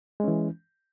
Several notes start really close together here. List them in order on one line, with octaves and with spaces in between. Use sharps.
G#3 C#4 E3